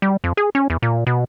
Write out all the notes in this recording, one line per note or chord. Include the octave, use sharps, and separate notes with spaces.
G3
F2
G#4
C#4
E2
A#2
B2